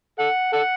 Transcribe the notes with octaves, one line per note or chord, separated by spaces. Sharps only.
A4 F#5
A4 F#5